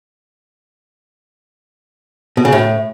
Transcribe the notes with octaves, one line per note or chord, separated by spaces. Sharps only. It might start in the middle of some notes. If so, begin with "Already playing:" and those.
B2
C#3
A2